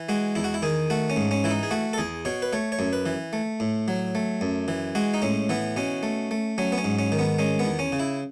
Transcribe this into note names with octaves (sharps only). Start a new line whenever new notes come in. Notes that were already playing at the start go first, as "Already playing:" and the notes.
Already playing: E3
G#3 F#4
E2 E4
F#4
E4
D#3 G#4
A3 F#4
C#4
G#2
C#4
E3 E4
D#4
G#4
A3 F#4
A4
E2 G#4
B2 C#5
B4
A3 C#5
C#5
F#2
B4
E3
A3
A2
F#3
A3
F#2
E3
G#3 F#4
D#4
A2 C#4
E3 B3
B2 C#4
A3
A3
F#3 C#4
B3
C#4
G#2
C#4
D#3
B3
G#3 C#4
B3
E2
C#4
C#3
E4